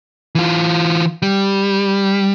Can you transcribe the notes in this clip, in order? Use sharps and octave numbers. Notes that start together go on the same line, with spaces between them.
E3 F4
G3